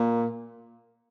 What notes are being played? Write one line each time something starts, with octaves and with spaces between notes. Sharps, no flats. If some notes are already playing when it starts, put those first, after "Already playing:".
Already playing: A#2 A#3